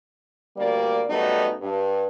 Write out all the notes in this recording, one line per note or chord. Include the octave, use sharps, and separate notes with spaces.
D2 G3 A#3 D5
F#2 G3 A3 B3 D#4
G2